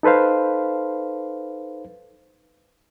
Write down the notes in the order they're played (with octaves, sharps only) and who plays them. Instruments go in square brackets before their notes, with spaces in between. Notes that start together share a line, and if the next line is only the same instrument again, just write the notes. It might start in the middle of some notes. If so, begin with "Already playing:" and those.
[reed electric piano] D#4 A4 B4 C5 F5